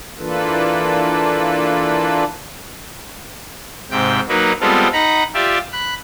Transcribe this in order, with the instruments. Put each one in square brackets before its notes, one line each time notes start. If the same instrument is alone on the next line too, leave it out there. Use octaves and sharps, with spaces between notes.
[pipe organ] E3 A#3 D4 F4 A4 B4
G#2 C3 G5
F#3 A#3 D#4 F#4 A#4 B4
G3 G#3 B3 C4 F4 A4
D#4 F#5 A#5 B5
F4 G4 D5 E5
B5 F#6